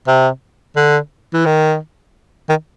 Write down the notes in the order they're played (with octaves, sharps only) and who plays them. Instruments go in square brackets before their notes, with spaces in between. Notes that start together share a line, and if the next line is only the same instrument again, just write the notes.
[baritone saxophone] C3
D3
E3
D#3
D#3